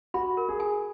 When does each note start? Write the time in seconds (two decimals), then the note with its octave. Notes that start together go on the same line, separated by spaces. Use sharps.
0.14 F#4 B5
0.37 A#4
0.49 G#4
0.60 G#5